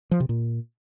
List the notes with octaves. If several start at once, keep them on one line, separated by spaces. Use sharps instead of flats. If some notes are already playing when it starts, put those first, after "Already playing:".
F3
C3
A#2